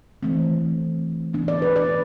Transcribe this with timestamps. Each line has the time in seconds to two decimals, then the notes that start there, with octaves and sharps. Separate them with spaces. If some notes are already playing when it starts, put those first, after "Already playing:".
0.23 E3 A3 C4
1.33 E3 B3 D4
1.48 D5
1.62 B4
1.76 D5